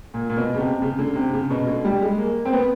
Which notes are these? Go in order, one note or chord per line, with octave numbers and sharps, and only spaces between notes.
A#2
A#2
B2
C#3
C3
C#3
D3
C3
C#3
B2
D3
G3
G#3
A#3
C4
B3